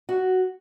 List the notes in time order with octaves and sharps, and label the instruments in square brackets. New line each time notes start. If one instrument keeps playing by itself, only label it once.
[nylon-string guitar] F#4